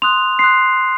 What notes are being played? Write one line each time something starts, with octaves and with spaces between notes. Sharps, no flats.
C6 D#6 F#6 F7
C6 D#6 F#6 C7